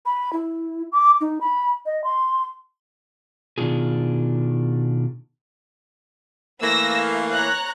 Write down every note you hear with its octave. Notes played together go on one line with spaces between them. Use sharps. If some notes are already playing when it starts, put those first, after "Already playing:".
B5
E4
D6
D#4
B5
D#5
C6
B2 D#3 D4 D#4 F4 G#4
E3 A3 A#3 B4 E6 A#6
F5
C#5 A#5 F#6